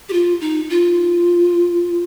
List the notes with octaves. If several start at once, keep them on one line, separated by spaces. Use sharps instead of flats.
G4
F4
D#4
F4